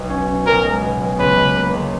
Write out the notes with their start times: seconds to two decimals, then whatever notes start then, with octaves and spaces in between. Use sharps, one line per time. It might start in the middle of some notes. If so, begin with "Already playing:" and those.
Already playing: B1
0.10 C#4
0.28 C#4
0.46 B1 A#4
0.64 G#3
0.82 B2
1.00 B1
1.19 C#2 B4
1.37 C#2
1.55 A#3
1.74 C#2